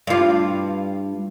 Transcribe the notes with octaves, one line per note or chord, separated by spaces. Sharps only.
G2 F4